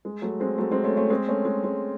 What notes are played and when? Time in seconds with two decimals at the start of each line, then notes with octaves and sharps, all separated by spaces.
0.05 G#3
0.22 F#3 A3
0.40 G#3 C4
0.58 F#3 A3
0.72 G#3 C4
0.84 A3 C#4
0.97 A3 C#4
1.10 G#3 C4
1.28 A3 C#4
1.45 G#3
1.64 G#3